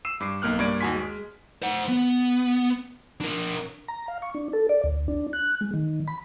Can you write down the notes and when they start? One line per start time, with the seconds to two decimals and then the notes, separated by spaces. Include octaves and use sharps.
0.05 E6 C7 D#7 E7
0.20 G2 D6 C7
0.42 B1 A#3 F6 F#6
0.59 G2 A#3 D5 G#6 D7
0.81 D#2 F#4 G#5 C6 B6
0.95 G#3
1.62 C5 F#5
1.89 B3
3.21 D4 A#4
3.88 A#5
4.08 F5
4.22 C#6
4.35 D4
4.53 A4
4.69 D5
4.84 D2
5.08 D4
5.33 F#6
5.61 G#3
5.74 D#3
6.08 B5